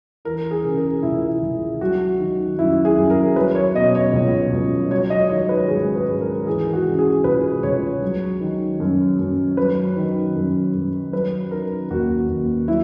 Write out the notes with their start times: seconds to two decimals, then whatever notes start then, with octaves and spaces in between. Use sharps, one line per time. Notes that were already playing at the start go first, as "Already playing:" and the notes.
0.25 E3 A#4
0.51 G#4
0.64 C#3
0.77 A#4
1.03 C#2 E4
1.42 C#2
1.81 F#3 F#4
2.19 D#3
2.58 F#2 E4
2.85 G#4
2.97 F#2
3.10 A#4
3.36 F#3 B4
3.55 C#5
3.75 B2 D#5
3.95 C#5
4.13 C#2
4.53 C#2
4.91 F#3 C#5
5.10 D#5
5.30 D#3 C#5
5.49 B4
5.68 G#2 G#4
5.95 B4
6.08 G#2
6.21 A#4
6.46 E3 G#4
6.73 F#4
6.86 C#3
6.99 G#4
7.24 C#2 B4
7.63 C#2 C#5
8.02 F#3
8.41 D#3
8.80 F#2
9.19 F#2
9.57 F#3 B4
9.97 D#3
10.36 F#2
10.74 F#2
11.12 F#3 B4
11.51 D#3 A#4
11.90 D#2 F#4
12.29 D#2
12.68 F#3 E4